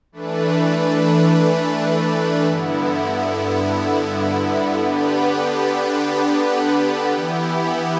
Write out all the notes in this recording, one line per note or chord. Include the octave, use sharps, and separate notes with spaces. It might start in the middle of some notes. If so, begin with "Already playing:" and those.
E3 A3 D4 B4
G2 D3 B3 E4
D3 B3 D4 G4 B4
E3 B3 E4 G4